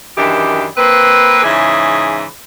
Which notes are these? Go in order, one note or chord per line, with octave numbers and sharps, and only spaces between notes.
F#2 D#3 E3 D4 G4
A#3 C4 B4
G#2 C#3 E3 E4 G#4